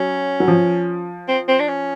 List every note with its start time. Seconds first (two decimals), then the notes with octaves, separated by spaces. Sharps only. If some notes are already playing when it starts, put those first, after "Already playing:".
Already playing: F#3 C#4
0.40 F#3
0.48 F3
1.28 C4
1.48 C4
1.60 D4
1.68 C#4